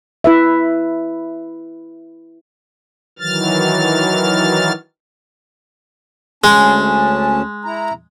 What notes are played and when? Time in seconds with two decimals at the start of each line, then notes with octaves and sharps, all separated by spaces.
0.24 E4 B4 E5
3.19 D#3 E3 F#3 F6 A6
6.44 D2 G#3 C#4 A5
7.65 E4 A#5